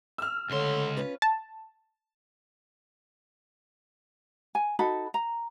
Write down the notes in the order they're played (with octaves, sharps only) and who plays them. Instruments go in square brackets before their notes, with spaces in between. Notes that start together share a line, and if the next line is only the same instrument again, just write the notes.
[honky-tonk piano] E6 F6
[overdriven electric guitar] C#2 C6 [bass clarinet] D3 [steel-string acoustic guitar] A3 C#5
[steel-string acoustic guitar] C#4 F4 B4
[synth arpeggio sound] A5
[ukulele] G#5
D#4 F#4 A4 B5
A#5